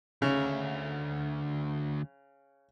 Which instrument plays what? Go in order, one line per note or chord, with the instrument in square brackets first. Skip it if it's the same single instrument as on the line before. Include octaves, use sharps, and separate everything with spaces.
[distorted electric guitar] D2 E5 [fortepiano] C#3